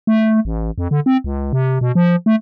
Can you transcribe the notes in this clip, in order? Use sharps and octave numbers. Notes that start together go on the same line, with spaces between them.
A3
A1
F2
D3
C4
C#2
C3
B2
F3
A3